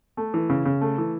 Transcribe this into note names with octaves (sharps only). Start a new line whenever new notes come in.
A3
E3
C#3
C#3
A3
E3